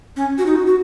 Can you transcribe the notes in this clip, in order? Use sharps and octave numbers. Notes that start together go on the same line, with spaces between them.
C#4
F#4
D#4
F#4
F#4